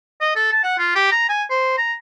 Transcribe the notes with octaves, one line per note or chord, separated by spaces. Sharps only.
D#5
A4
A5
F#5
F4
G4
A#5
G#5
C5
A#5